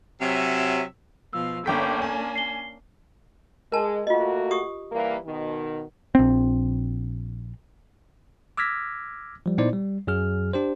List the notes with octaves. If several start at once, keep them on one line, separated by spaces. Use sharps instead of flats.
C3 F#3 C#4 E5
B2 F3 F5 E6
G1 A#3 C#4 D4 A4 G5 D6 B6
G#5
C7 G7
G#3 A#4 A5
A3 A#3 F4 F#4 D#5
G4 C#6 D#6
E3 G3 A#3
B2 D#3
A#1 C4
D6 E6 F6 G#6 A#6 B6
F3 G3
A#2 B3 D#4 E4 C5 D5
G3
F#2 F#3 G#4 F6
D4 G4 C5